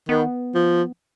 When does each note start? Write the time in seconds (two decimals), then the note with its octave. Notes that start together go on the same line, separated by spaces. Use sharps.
0.09 D#3 B3
0.55 F3